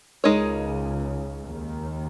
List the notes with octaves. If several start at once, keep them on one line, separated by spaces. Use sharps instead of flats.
C#2 C#3 G#3 D#4 A#4 C#5
D#2 D#3